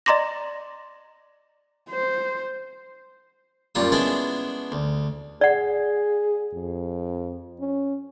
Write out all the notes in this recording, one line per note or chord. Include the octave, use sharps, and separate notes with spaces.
D5 D#5 A#5 C6 D6 A#6
C5
F#2 A#2 G3 F4 D#6
G#3 B3 C#4 D4 E4 D5
D2
G#4 D5 F#5
F2
C#4